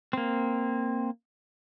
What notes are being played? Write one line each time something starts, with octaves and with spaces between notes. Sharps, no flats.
A#3 C4